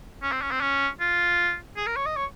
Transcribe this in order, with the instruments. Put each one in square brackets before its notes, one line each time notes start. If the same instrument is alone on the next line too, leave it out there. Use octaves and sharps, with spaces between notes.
[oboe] C#4
C4
C#4
C4
C#4
F4
G#4
A#4
C#5
D#5
C#5